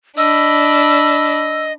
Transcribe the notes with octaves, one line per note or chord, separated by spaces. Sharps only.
D4 D#5 B5 E6